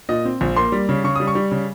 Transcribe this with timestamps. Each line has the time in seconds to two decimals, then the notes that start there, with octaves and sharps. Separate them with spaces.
0.09 A#2 D#5
0.25 C4
0.41 A#1
0.56 A#3 C6
0.72 G3
0.89 C#3
1.04 C#3 C#6
1.16 G3 D#6
1.27 C#6
1.35 G3
1.51 C#3